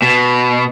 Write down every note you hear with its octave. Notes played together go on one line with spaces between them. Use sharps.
B2